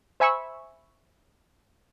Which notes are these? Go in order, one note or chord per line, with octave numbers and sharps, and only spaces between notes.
C5 E5 G#5 B5 C#6 E6